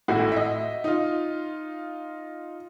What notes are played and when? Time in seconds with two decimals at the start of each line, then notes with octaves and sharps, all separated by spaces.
0.08 G#1 A2 E4 F#4
0.32 D#5 E5
0.84 D#4 F4